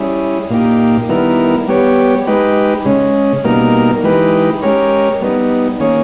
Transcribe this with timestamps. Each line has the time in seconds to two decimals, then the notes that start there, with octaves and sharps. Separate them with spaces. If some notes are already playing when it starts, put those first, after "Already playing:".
Already playing: G3 C#4 E4 G#4
0.50 A#2 A#3 D#4 G4
1.09 D#3 G3 B3 E4 A#4
1.68 G3 B3 G4 C#5
2.27 G#3 D#4 G4 B4
2.86 C#3 G#3 C#4
3.44 B2 G3 A#3 D#4 A#4
4.03 E3 G#3 D#4 G4 B4
4.62 G#3 C#4 G4 A#4 C#5
5.21 G3 B3 D#4
5.80 D#3 A#3 C#4 G#4 C#5